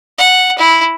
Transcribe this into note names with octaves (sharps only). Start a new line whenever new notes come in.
F#5
E4